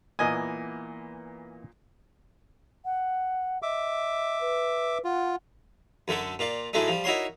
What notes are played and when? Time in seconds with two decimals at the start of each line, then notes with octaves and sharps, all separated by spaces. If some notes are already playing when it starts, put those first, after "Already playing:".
0.19 A#2 E3 A#3 B3 D#5 G#5
2.85 F#5
3.62 D#5 E5 D6
4.41 B4
5.05 F4 F#5
6.08 F#2 D3 A3 A4
6.39 A#2 F4 D5
6.73 A2 F#3 G#3 A3 D4 D#4
6.88 F3 G3
7.04 D#4 E4 F#4 A#4 C#5 C6